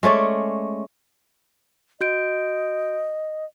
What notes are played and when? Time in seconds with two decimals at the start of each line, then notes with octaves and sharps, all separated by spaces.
0.03 G#3 A3 C#4 D5
2.01 F#4 D#5 G6 D7